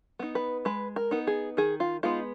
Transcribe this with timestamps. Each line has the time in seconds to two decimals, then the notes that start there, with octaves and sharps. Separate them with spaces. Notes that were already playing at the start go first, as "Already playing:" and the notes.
0.19 B3 D#4
0.35 B4
0.65 G#3 B4
0.96 A#4
1.11 B3 D#4
1.27 G#4
1.57 D#3 G#4
1.80 F4
2.03 G#3 B3 D#4 F4